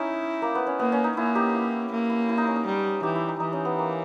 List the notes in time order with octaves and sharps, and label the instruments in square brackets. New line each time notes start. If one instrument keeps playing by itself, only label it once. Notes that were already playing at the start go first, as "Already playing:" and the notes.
Already playing: [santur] C#4 D#4 [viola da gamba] E4
[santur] A#3
B3
C#4
[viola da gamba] A#3 [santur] B3
[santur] C#4
D#4
[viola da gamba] A#3 [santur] E4
[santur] D#4 G4
E4
[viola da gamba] A#3
[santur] E4
E4
D#4
C#4
D#4
[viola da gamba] G3
[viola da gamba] E3 [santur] D#4 G4
[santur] E4
D#4
[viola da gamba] E3 [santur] D#4
[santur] C#4
B3
A#3